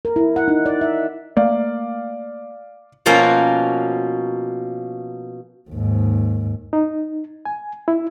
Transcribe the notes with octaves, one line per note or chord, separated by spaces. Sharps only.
A#4
E4
F#5
D#4
D5
E5
A3 A#3 D5 F5
B2 F3 A#3 C#4 F4 F#4
D#2 G#2
D#4
G#5
E4